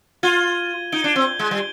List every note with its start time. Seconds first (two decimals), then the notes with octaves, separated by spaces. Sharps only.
0.23 F4 G#6 D#7 G7
0.92 D#4 G6 D7 G7
1.04 D4
1.16 C4
1.39 G#3
1.51 G3